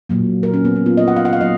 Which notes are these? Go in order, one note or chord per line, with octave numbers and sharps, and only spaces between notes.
A#2 F#3 A#3
A#4
C#4
B3
B3
F4
D#5
F#5
F5
F#5
F5
F#3 A#3 D#5